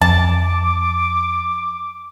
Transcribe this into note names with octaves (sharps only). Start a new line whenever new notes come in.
F2 A5 D6